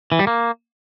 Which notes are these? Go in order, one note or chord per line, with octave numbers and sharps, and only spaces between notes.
E3
G3
A#3